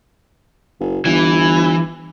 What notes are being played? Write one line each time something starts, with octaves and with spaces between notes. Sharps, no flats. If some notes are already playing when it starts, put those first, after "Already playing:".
F#1
G1 E3